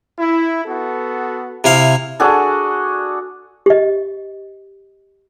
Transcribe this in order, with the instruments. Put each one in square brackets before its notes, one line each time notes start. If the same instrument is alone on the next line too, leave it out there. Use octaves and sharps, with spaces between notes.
[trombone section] E4
B3 F#4 A4
[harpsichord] C3 E4 F5
[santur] D4 F#4 G#4 A4
[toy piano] G4 D#5